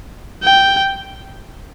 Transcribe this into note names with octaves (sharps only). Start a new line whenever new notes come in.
G5